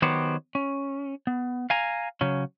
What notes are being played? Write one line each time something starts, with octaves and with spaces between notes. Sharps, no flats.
D#3 F#3 B3 G4 C5 C#5
C#4
B3
F5 G#5 A#5
C#3 F#3 C#4